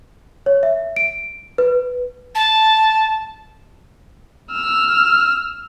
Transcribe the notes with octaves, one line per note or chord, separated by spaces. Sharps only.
C#5
E5
D7
B4
A5
E6 F6